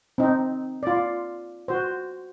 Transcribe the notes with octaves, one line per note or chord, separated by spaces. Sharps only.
C4 D#4
F4 D5
F#4 C5